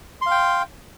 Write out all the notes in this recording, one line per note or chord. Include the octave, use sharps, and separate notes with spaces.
F5 G5 C6